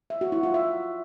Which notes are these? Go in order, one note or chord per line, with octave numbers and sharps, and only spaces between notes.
E5
F#4
E4
F4
E5